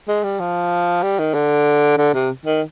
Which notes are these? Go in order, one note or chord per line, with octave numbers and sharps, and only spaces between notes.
G#3
G3
F3
G3
D#3
D3
D3
C3
D#3